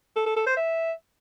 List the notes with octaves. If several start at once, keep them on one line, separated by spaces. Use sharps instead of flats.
A4
A4
A4
C5
E5